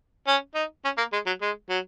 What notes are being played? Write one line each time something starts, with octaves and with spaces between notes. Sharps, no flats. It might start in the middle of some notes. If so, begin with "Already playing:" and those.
C#4
D#4
C#4
A#3
G#3
F#3
G#3
F#3